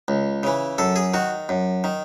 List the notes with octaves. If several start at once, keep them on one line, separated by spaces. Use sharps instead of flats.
C#2
C#3 E3
F#2 A4
G#4
D#3 F#4
F#2
D#3